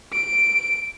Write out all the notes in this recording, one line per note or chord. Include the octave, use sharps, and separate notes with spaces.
D7